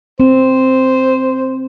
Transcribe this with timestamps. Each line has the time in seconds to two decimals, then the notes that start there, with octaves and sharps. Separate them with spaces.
0.20 C4 C5